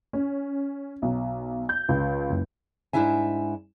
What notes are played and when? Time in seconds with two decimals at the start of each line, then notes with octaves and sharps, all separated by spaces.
0.13 C#4
1.02 B1
1.69 G6
1.89 C#2
2.29 F#1
2.93 G#2 G#3 D4 E4 E5 G#5